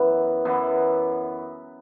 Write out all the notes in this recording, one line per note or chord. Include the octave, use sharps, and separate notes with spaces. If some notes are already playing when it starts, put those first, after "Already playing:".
Already playing: F#2 E3 B3
F#2 E3 B3